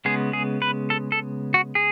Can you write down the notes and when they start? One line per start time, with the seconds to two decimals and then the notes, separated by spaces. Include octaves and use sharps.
0.05 C#3 G#3 B3 G#4
0.33 G#4
0.62 B4
0.90 A4
1.12 A4
1.54 F#4
1.75 G#4